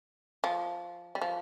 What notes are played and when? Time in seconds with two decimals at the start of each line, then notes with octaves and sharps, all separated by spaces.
0.44 F3
1.15 G3
1.21 F3